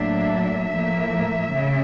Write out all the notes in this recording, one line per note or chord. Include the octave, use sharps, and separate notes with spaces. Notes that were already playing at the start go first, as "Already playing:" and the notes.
Already playing: A2 F#3 A#3 D4 E5
A2 F3 A#3
C#3